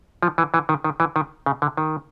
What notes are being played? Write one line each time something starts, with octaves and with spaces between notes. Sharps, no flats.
F3
E3
E3
D#3
D#3
E3
D#3
C#3
D3
D#3